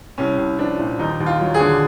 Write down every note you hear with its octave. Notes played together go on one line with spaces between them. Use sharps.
C2 C#4
C2
F3 D4
A#2
D#2 D#4
D#2
F4
F#3
G#4
D3